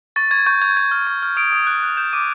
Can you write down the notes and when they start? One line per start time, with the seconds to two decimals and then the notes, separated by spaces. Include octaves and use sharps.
0.16 C#6 A6
0.31 C#6 G#6
0.46 C#6 G6
0.62 G6 G#6
0.77 C#6 G#6
0.91 F6
1.07 C#6
1.23 F6
1.37 D#6 D7
1.52 D#6
1.67 F#6
1.83 F#6
1.97 G6 E7
2.13 D6 D#7